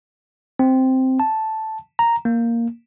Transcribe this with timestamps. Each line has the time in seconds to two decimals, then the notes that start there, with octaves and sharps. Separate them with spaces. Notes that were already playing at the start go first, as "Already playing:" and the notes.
0.59 C4
1.20 A5
1.99 A#5
2.25 A#3